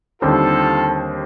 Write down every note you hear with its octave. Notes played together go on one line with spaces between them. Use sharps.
D#2 D3 G3 C4 F4 A4